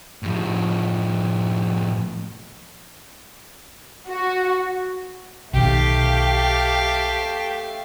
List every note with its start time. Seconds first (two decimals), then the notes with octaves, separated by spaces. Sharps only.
0.23 A2 F3
4.08 F#4
5.53 B1 D#3 A3 G4 F5